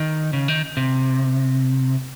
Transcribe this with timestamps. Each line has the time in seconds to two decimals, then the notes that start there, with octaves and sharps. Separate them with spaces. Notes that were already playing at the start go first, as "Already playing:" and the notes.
Already playing: D#3
0.33 C#3
0.48 D#3
0.77 C3